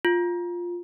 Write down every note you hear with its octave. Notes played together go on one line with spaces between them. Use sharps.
F4